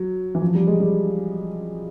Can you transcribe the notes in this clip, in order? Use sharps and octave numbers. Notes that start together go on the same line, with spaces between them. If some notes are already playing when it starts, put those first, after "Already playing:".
Already playing: F#3
E3
F3
G3
G#3
G3